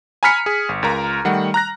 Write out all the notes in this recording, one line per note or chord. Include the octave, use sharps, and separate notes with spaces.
G#5 A#5 B5 F6 B6 C#7
G#4
G1
C#2 F4 A#4 A#5
D#3 G3 A3 F#5
A#5 F#6 A#6